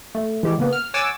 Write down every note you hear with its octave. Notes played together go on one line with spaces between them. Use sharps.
A3
E3 G#3 G4
C#3 A#3 B3
F6
C#5 F#5 G#5 D6 E6 A6